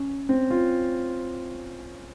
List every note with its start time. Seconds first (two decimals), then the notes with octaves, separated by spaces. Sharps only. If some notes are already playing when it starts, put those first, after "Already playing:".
Already playing: C#4
0.29 C4
0.51 F4